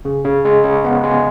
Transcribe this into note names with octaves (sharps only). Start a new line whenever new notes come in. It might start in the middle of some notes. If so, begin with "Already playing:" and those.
C#3
C#3
G#3
C#3
B3
G#3